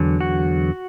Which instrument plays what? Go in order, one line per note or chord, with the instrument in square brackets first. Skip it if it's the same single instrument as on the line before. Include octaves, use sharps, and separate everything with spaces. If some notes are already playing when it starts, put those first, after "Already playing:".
Already playing: [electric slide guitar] E2 D3 F#3
F#4